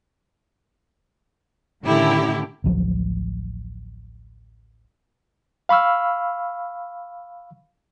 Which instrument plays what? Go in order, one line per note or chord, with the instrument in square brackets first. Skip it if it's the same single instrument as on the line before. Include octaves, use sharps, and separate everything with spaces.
[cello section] A2 D3 D#3 C#4 E4 G4
[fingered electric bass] A1 D2 F3 F#3
[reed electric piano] F5 B5 C#6 E6 F6